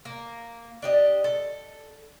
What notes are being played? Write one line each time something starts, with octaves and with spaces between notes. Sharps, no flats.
A#3
D4 G4 D#5
A4